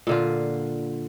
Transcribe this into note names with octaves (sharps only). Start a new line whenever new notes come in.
A#2 D3 F4